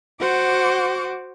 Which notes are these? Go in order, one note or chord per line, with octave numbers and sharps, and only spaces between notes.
F#4 C5 F#5 D6